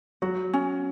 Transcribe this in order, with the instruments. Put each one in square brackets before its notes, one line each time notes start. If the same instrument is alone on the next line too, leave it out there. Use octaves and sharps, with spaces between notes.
[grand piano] F#3 [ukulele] F#4
[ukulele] C#4